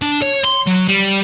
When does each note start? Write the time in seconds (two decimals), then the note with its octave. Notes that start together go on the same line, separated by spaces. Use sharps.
0.02 D4
0.22 C#5
0.45 C6
0.67 F#3
0.89 G3